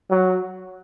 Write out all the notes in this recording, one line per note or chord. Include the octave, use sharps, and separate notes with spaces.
F#3